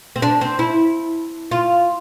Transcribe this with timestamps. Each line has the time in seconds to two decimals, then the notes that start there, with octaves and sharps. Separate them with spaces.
0.16 C4
0.22 D4
0.41 C4
0.59 E4
1.51 F4